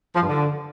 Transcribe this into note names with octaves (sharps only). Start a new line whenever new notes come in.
F3
G2
D3